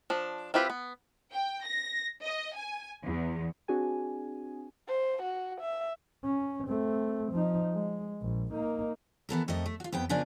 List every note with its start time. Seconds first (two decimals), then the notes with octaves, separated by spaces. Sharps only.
0.10 F3 D4
0.54 C4 E4 F4 G4 B4
0.70 B3
1.31 G5
1.65 A#6
2.24 D#5
2.55 G#5
3.04 E2
3.68 C4 D4 F#4 G#4 G#5
4.88 C5
5.22 F#4
5.61 E5
6.24 C#4
6.68 A3 C4
7.33 F3 D#4
7.74 G#3
8.22 A#1
8.52 A#3 D#4
9.29 E3 B3 A4 A#4
9.48 F2 A3 A#4 D#5
9.66 A3
9.80 F4 F#4
9.92 F2 B3 G5
10.09 C#3 F3 D4 A#4 D5 G#5